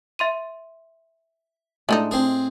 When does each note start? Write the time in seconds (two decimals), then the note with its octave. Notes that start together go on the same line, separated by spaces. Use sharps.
0.19 E5 C6 D#7
1.89 A2 G#3 A3 D4 D#4
2.11 C4 G#4